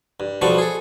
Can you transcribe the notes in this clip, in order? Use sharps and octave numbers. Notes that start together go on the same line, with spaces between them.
G2
B1 F3 G3 B3 A5 C#6
G#4 A4